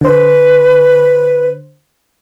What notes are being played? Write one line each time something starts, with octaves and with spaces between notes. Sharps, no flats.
D3 B4 C5